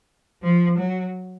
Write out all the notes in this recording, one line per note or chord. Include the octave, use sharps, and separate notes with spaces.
F3
F#3